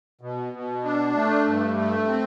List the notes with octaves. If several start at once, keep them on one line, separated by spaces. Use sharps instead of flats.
B2
B2
D4
A3
G2
A3
C4